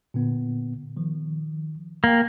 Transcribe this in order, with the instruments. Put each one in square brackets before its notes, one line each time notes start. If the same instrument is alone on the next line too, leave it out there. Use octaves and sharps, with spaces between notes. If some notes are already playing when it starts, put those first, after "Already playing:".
[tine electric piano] A#2 D3 B3
D#3 F3
[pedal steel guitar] A#3 [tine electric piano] A#4 G5